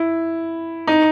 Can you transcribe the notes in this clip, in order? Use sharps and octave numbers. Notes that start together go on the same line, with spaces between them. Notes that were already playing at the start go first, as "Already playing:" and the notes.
Already playing: E4
D#4